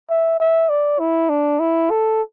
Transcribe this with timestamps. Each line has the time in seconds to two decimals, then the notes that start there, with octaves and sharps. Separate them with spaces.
0.10 E5
0.40 E5
0.69 D5
1.00 E4
1.29 D4
1.60 E4
1.90 A4